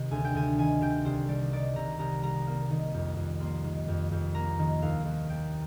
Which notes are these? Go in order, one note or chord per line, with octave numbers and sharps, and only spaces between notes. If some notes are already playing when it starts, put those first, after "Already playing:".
Already playing: C3 D#3
D2 G#5
G5
D2 G#5
D#3 G#5
C3 G5
C2 C5
G3 D5
D#3 D5
C3 A#5
C2 A#5
G3 A#5
A#3
D#3
F2
F2
A#3 C6
D#3
F2
F2
A#3 A#5
D#3
D#2 F5
D#2
A#3 G5